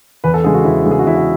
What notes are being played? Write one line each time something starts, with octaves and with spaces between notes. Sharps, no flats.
E2 B4
A4
C#3 G#3 G#4
F#4
E2 E4
C#3 G#3
G#4
F#4
E2 E4
F#4